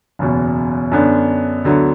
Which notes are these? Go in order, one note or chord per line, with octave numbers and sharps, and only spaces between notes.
F#1 E2 B2
F#2 D3 B3 D4
D2 D3 F#3 B3